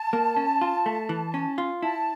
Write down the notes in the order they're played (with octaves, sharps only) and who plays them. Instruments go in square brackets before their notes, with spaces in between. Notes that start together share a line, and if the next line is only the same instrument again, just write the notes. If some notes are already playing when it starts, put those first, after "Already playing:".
Already playing: [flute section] A5
[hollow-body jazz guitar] A#3
C#4
F4
A3
E3
C#4
F4
[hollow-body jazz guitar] E4 [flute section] A5